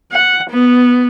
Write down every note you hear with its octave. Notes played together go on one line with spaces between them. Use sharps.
F#5
B3